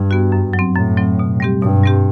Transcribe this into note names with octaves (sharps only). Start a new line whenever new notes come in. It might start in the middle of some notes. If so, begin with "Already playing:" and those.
Already playing: G2
B3 F#4
F#2
F#3
C4
F#2 A2
F#3 C4
B2
G3 C4 G4
G2 B2
G3 C4 G4